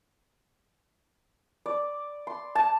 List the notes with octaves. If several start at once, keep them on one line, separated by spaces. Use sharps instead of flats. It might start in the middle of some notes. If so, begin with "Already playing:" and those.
D5
C6
A5